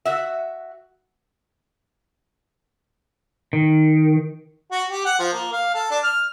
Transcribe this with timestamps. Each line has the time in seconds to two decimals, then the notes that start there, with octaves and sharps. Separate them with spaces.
0.05 F#4 E5
3.53 D#3
4.71 F#4
4.90 G4
5.06 F#5
5.19 F3
5.33 A#3
5.52 F5
5.74 A4
5.91 D4
6.03 F6